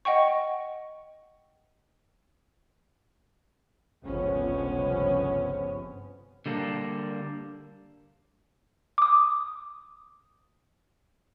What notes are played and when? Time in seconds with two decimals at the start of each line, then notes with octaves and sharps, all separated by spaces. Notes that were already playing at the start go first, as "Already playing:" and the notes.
0.05 D#5 F#5 G5 C#6
4.03 G1 C#2 C3 F3 B3 C#4
6.46 D3 G3 A#3 D4
8.98 D6 D#6